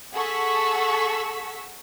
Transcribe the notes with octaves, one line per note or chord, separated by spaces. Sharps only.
G#4 A4 F#5 C#6 E6 B6